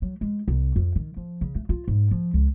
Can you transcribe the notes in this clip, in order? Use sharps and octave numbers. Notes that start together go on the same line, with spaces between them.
F#3
G#3
C2
F2
D#3
F3
C#3
A3
F4
G#2
F3
C#2